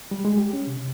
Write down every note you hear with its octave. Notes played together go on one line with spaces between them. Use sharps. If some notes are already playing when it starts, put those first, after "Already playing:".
G3
G#3
G4
C#4
C3